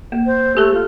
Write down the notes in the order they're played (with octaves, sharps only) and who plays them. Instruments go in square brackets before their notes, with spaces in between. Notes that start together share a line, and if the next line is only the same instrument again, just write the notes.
[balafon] A#3
[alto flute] C5
[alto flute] A3 [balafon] G4 A4
[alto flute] F4